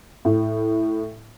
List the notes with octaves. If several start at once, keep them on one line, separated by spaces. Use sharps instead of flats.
A2